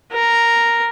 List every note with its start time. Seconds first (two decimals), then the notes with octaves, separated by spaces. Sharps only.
0.12 A#4